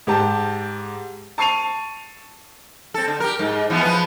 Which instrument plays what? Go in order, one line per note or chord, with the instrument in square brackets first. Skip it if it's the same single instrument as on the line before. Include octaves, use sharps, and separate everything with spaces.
[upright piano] G#2 G4 A5
A5 C#6 C7 D#7 F7
[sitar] C4 A4
D3
G4 A#4
G#2
E3 F3 B3
F3 B4